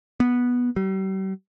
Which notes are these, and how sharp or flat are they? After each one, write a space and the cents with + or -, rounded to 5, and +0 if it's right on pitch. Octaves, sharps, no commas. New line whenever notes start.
B3 -10
G3 -40